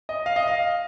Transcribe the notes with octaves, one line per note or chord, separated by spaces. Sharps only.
D#5
F5
D#5
F5